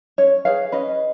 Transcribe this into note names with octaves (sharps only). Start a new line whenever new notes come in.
C#4 C#5
G#4 B4 C#5 F5
C#4 B4 D#5